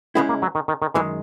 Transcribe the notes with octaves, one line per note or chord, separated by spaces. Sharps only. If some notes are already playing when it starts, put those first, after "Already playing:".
C#3 G#3 B3 C#4 E4
A#3
F#3
D#3
D#3
D#3
F#2 D#3 E3 G#3